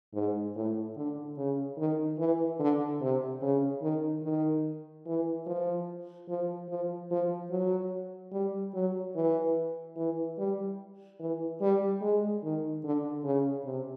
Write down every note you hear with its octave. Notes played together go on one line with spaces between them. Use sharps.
G#2
A2
D3
C#3
D#3
E3
D3
C3
C#3
D#3
D#3
E3
F3
F3
F3
F3
F#3
G3
F#3
E3
E3
G3
E3
G3
G#3
D#3
D3
C#3
C3